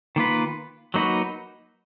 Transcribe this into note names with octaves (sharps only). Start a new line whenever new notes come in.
D#3 A#3 F4 B4
F#3 A#3 D#4 F#4 B4